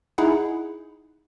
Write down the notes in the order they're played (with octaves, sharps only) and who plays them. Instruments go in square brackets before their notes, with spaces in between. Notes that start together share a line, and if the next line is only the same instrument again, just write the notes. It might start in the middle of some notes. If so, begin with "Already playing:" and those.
[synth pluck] D#4 E4 G#4 F#5